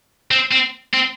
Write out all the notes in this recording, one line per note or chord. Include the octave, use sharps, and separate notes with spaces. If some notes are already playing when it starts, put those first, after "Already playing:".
C4
C4
C4